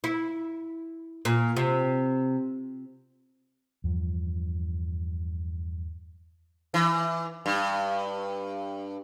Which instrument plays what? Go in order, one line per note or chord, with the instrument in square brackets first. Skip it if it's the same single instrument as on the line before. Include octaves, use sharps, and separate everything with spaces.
[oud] E4
A#2
C3
[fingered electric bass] E2 G2 F3
[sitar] E3
G2